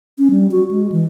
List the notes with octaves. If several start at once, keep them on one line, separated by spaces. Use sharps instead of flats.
C#4
G3
F#4
G#3
E3